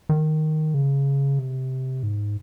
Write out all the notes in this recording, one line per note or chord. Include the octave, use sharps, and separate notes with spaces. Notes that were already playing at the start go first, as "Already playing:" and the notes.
D#3
C#3
C3
G#2